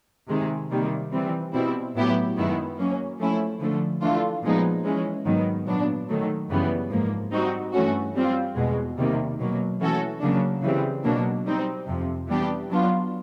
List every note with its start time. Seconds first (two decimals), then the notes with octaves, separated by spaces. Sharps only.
0.29 C3 D#3 G#3
0.71 C3 D#3 G3 A#3
1.13 E3 G3 C4
1.54 B2 G3 C4 E4
1.95 A2 F#3 B3 E4 G4
2.36 F#2 D#3 G#3 B3 E4
2.78 F#3 A#3 C#4
3.19 F3 A3 C#4 E4
3.60 D3 F3 A3
4.02 E3 A3 D4 F4
4.44 A#2 F3 G#3 B3 D#4
4.85 E3 G#3 C#4
5.26 G#2 D#3 F#3 B3
5.67 A#2 F#3 B3 D4
6.09 D#3 F#3 A3
6.50 F#2 C#3 E3 G3 B3
6.91 G#2 F3 A#3
7.33 G3 C4 D#4 F#4
7.74 G2 E3 A3 C#4 F#4
8.15 G3 C4 F4
8.56 E2 B2 G#3
8.98 C3 D#3 G3 A#3
9.40 B2 F#3 A#3
9.81 E3 A3 C#4 F#4 A4
10.22 C#3 F#3 A#3 D4
10.63 C#3 E3 G3 C4
11.04 B2 F#3 A#3 D4
11.46 G3 C4 D#4
11.88 F2 C3 F3
12.28 E3 G3 B3 D4 G4
12.70 F#3 B3 D4 F4